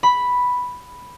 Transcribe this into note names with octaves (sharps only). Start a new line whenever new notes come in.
B5